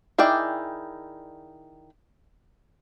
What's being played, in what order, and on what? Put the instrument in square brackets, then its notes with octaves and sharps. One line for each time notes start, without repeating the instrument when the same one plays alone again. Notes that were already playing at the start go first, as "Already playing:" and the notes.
[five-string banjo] D#3 E4 G#4 D5 G5